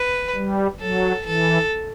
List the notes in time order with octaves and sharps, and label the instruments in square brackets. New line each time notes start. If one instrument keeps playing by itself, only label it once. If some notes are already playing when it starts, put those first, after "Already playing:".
Already playing: [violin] B4
[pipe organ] G3
[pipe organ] F#3 [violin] A4
[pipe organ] E3 [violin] A4